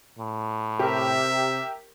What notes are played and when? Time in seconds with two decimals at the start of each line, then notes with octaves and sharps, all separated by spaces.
0.19 A2
0.79 C3 G4 A#4 E5